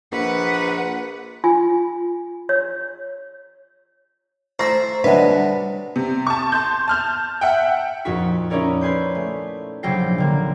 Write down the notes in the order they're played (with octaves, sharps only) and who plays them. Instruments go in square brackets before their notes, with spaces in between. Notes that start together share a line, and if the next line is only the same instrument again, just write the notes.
[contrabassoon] A#1 [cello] B4 F#5
[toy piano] F4 G#5
C#5
[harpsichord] A3 E4 E5 [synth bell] C5 [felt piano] A#5 C#6 A#6
[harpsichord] C2 D3 F#3 [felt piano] D4 D#5 F#5 [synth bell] B4 [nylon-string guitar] E5
[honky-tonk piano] C3
A5 C#6
A5 C6 G6
A5 F6 G6
E5 F#5 G5
[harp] F2 A#2 D#4 F#4 C#6 B6
C#4 D#4 E4 A#4 C#5 D5
B4 G#5 C6 G6
A3
A#1 C3 F#3 G5 A#6 C7
D3 A#3